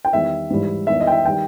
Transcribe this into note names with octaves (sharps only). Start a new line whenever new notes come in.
G5
E2 D#3 G3 E5
G#2 E3 G3
E2 D#3 G3 E5
D#5
G5
E5
D#3 G3 G5